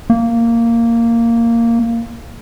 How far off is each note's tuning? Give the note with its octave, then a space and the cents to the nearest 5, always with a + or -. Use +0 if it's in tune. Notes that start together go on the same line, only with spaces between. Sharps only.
A#3 -10